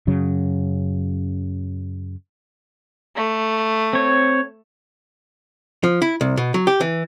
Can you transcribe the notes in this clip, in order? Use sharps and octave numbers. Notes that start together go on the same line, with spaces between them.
F#2 C#3 F#3
A3
C4 C#5
F3
E4
C2
B2
F#3
G4
E3